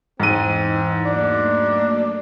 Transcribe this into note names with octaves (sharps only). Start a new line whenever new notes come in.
E2 G#2 E3 C4 D#4 D#7
F#3 A3 A#3 D4